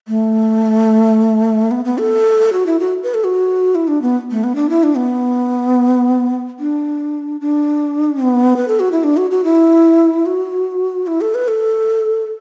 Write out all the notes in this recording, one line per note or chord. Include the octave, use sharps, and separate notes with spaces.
A3
B3
B3
A4
F#4
E4
F#4
B4
A4
F#4
E4
D4
B3
A3
B3
D4
E4
D4
B3
D4
D4
B3
B4
A4
F#4
E4
D4
F#4
F#4
E4
F#4
E4
A4
B4
A4